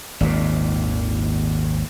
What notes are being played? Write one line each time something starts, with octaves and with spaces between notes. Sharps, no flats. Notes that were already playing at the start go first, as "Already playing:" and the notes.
G#1 D#2 A#2